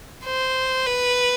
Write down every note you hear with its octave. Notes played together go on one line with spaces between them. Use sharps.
C5
B4